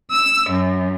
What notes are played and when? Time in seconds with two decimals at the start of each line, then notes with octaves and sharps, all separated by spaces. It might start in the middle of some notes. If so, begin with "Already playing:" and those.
0.11 E6
0.51 F#2